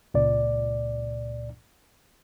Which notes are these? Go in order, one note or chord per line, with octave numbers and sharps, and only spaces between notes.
C#2 A#2 D5